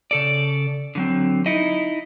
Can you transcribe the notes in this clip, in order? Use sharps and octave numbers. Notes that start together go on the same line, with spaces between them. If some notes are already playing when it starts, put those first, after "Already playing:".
C#3 A4 D5
D3 F#3 C4
D#4 E4 D#5